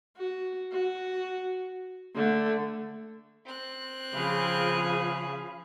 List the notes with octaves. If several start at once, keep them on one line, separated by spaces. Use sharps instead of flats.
F#4
F#4
D3 A3
C4 F#6
C#3 F3 G#4 F5 B5